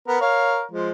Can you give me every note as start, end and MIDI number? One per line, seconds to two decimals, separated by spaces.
0.08 0.19 59
0.08 0.19 70
0.21 0.63 70
0.21 0.63 73
0.21 0.63 77
0.72 0.92 53
0.72 0.92 56